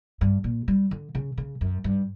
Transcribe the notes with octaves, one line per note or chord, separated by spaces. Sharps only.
G2
A#2
G3
D3
C#3
C#3
F#2
G2